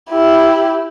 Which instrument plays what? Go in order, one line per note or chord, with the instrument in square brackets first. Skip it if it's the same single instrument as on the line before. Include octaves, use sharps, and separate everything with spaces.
[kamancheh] E4 G4